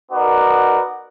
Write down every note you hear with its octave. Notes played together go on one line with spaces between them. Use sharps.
B3 D#4 F#4 A#4 D5